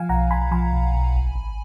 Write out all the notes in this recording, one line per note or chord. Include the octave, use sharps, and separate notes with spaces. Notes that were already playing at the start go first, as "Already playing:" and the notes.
Already playing: F3 F5 G#5
B1 F#5 A#5
B1 G#5 B5
F3 G#5 B5
B1
B1
G#1
G#1